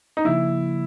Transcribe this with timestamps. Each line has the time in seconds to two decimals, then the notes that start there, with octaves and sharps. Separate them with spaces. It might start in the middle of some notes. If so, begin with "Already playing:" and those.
0.17 D#4
0.25 C#3 F3 A#3 E4